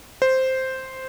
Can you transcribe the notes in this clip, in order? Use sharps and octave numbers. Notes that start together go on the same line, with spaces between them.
C5